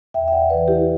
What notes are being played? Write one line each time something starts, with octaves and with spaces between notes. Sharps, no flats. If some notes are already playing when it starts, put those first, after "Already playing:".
E2 E5 G5
E5
D5 F#5
C#3 E3 B4 D5
E4 G4